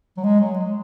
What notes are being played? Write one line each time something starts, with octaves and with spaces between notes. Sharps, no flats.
F#3
G#3
F#3
G#3